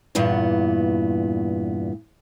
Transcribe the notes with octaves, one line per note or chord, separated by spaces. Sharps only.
E2 G2 A#2 B3